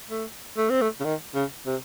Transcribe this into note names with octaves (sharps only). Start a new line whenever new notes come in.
A3
A3
C4
A3
C#3
D#3
C#3
C3